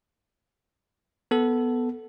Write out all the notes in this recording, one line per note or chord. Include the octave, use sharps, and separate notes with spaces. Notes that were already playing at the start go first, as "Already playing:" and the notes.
B3 A4